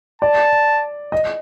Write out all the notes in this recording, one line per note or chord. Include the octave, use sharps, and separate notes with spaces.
D5 A5
D#5